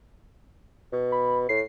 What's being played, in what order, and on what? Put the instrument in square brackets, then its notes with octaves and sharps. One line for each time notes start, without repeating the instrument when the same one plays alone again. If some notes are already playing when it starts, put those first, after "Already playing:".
[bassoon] B2
[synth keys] B5
[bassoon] A2 [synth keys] C7